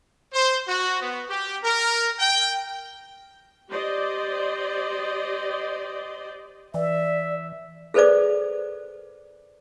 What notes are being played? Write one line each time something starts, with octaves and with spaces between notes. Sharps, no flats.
C5
F#4
B3
G4
A#4
G5
G4 C5 D5 D#5
E3 D5 E5
G#4 A4 B4 C5 D5 D6